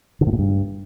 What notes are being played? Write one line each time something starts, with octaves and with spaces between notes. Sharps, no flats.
D3
A2
A#2
G2